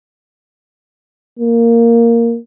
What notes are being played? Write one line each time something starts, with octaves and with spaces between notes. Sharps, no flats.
A#3